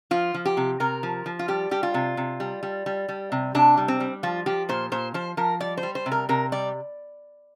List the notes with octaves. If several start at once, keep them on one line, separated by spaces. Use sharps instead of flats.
F3 F4
F3
G4
C3
C3 A#4
F3
F3
F4
G3 G4
G3 G4
F4
C3
C3
G3
G3
G3
G3
C3
C3 D4
G3
C4
G3
F3 F4
F3 G4
A#2 C5
A#2 C5
F3 C5
F3 A#4
G3 D5
C5
G3
C5
C3
A#4
C3 A#4
G3 D5